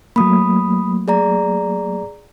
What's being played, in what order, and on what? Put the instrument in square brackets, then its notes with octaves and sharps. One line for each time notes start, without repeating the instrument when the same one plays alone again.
[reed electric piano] F#3 A3 A#3 [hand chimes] B5 D#6
[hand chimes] G#4 D5 A#5